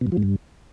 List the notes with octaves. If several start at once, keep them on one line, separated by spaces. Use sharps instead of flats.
B2
G2
F3
G#2
G2